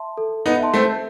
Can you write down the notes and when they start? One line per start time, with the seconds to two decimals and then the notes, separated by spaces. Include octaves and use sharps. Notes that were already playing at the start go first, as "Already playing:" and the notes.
Already playing: E5 A5 C6
0.17 A4
0.46 B3 D#4
0.59 E5 A5 C6
0.74 A3 C4